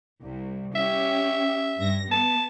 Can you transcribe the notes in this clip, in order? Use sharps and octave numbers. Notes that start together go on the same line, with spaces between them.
C2
C#4 G4 E5
G2 A#6
B3 A5